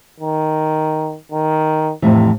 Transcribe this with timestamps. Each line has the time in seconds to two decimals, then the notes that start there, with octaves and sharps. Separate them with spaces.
0.20 D#3
1.31 D#3
2.02 F2 A2 C3 E3